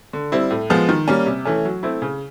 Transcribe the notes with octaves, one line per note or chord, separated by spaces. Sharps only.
D3
G3 C4 E4
A2
F3 G#3 B3
D#3
G3 A#3 C#4
C3
E3 A3 C#4
F#3
A3 C4 E4
C#3